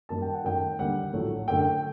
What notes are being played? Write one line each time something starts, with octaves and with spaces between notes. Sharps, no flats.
F#2 D#3 G3 A#3 A5
G5
F#5
F#2 D#3 A3 G5
D#2 D3 G3 F#5
A#1 A2 F#3 A3
F#2 D3 A3 G5
G5